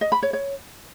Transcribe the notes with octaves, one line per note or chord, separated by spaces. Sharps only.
D#5
B5
C#5
C#5